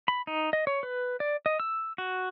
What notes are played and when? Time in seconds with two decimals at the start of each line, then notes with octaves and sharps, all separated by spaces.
0.08 B5
0.27 D#4
0.53 D#5
0.67 C#5
0.83 B4
1.20 D5
1.46 D#5
1.60 E6
1.98 F#4